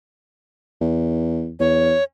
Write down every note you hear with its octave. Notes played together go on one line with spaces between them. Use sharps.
E2
E2 C#5